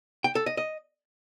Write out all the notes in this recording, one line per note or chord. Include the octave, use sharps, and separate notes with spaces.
G5
A4
D#5
D#5